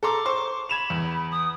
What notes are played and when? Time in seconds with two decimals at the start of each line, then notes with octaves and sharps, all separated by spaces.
0.03 A4 A#5 C6 D6
0.25 C5 C6 C#6
0.69 B5 G#6 E7 F7
0.90 E2
1.31 D#6